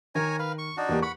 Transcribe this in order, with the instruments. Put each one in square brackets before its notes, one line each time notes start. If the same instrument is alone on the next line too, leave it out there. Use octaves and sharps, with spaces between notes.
[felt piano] D#3 A#4 [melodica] C#5 G#5 A#5
[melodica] B4 F5
C#6
D4 D#4 F#4
[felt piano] E2 A#3 G4
[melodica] F#5 B5 [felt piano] C#6